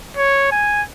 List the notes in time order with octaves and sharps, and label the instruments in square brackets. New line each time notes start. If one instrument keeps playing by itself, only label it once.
[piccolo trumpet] C#5
G#5